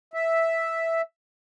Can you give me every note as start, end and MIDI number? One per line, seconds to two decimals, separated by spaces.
0.14 1.02 76